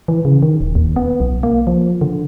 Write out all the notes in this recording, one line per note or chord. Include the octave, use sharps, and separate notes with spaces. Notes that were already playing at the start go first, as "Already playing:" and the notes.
E3
C#3
D#3
D#1
D#2
B3
B1
A#3
F3
D3